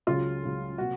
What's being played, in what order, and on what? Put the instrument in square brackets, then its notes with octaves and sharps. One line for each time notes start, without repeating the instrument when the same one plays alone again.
[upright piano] C#2 C#3 F#3 C#4 [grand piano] F4
[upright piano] C#2 C#3 F#3 C#4
[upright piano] C3 F#3 A#3 [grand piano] F#4